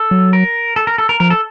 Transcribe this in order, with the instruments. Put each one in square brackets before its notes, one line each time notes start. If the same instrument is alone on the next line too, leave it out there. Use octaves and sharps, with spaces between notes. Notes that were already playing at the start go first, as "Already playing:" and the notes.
Already playing: [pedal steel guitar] A4
[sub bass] F#3
[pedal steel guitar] A#4
A4
A#4
A4
A#4
[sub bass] F3 [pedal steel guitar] A#4
[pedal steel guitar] A4